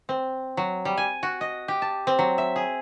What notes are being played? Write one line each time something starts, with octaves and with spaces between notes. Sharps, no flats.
C4
F#3
G3
G#5
F#4
D#5
G4
A5
C4
F#3
E5
G#4